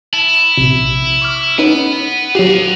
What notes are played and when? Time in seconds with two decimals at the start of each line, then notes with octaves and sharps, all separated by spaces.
0.13 E4 A5
0.57 A#1 C3
1.22 C#6 D6 F6
1.58 C#4 D#4 B4 F#5 B5
2.35 F#3 F#4 G4 B4 F5